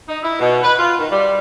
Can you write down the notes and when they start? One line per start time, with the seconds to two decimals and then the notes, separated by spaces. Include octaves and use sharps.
0.08 D#4
0.23 E4
0.39 B2
0.62 B4
0.77 F4
0.98 D#3
1.10 G3